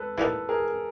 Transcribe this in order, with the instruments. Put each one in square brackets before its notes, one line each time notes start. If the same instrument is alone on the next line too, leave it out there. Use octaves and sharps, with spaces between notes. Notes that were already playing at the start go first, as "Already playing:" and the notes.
Already playing: [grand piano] A4 B4
[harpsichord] E3 G3 A#3 D#4 [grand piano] A4 B4
[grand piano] G#4 A#4